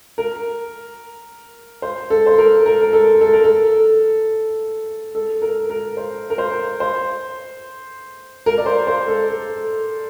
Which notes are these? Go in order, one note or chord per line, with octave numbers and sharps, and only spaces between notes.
A#4
C5
A4
C5
A#4
A#4
A#4
A4
A4
A#4
A4
A4
A#4
A#4
C5
A#4
C5
C5
A#4
D5
C5
C5
A4
A4